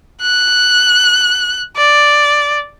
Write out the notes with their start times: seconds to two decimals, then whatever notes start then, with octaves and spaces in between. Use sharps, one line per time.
0.22 F#6
1.77 D5